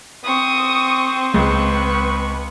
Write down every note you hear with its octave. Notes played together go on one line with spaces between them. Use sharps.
C4 C#6 D#6
C#2 B4 C#6